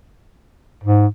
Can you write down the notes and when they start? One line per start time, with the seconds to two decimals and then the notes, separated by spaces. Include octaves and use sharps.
0.84 G#2